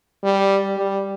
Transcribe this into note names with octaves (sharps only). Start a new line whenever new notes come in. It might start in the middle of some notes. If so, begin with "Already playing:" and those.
G3
G3